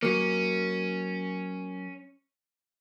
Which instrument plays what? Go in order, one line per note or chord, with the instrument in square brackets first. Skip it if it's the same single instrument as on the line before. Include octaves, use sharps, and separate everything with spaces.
[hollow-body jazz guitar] F#3 A#3 [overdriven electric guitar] C#4